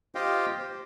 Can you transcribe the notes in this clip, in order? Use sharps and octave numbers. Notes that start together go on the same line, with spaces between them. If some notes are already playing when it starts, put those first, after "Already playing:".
F4 G4 C5 D#5 F5 G5
C5